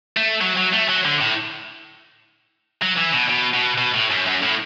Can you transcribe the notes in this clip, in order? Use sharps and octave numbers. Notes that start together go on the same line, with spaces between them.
A3
F#3
F#3
A3
F#3
D3
A2
F#3
E3
B2
B2
B2
B2
A2
F#2
F#2
A2